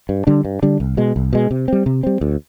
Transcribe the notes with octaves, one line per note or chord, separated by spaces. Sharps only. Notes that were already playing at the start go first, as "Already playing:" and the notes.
G2
D3 G3 D4
G2
D3 G3 D4
C2
B2 G#3
C2
B2 G#3
C3
G3 C4
C3
G3 C4
D2